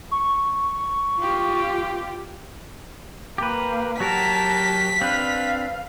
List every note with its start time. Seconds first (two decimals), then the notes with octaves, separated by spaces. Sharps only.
0.11 C#6
1.19 F4 G4
3.38 A#3 G4 B4
4.00 F#3 F#4 G4 A#4 A5 B6
5.01 C4 D4 B4 F5